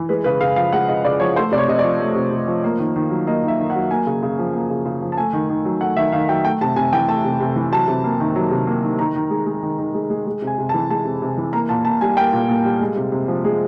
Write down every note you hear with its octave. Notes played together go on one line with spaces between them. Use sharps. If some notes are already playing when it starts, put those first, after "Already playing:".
Already playing: E3
G#3 B4
C#3 B4
C#3 F5
F3 F5
G#3 F#5
C#3 D#5
C#3 D5
F3 C#5
A3 C5
C3 D5
C#5
C3 D#5
D5
F3
A3
C3
C3
F3
A#3
D#3
D#3
F#3
A#3 D#5
D#3
E5
D#3
F#5
F#3
A#3 G#5
C#3
C#3
F3
A#3
C#3
C#3
F3
A5
A3 G#5
D#3
D#3
F#3
A3 F#5
D#3 E5
D#3 F5
F#3 G5
A3 G5
C3 A5
C3 G#5
E3 G5
A3 A5
C3
C3
E3
F#3 A5
C3
A#3
D#3
F#3
C3
A#3
D#3
D#3 A#5
D#3
G#3
G#3
D#3
D#3
G#3
G#3
G#3
C3
G#5
C3
A5
E3
G#3 A5
C3
C3
E3
A#3 A#5
A#2 A5
A#2 A5
G3 G#5
A#3 G5
A#2
A#2
G3
G#3
C3
C3
F3
G#3